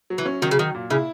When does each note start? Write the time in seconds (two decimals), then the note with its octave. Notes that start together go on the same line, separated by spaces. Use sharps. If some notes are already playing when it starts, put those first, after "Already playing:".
0.10 F#3
0.18 E3
0.26 C#4
0.42 D#3 F#3
0.51 C#3
0.58 D#3 F#3
0.75 A#2
0.90 C#3 E4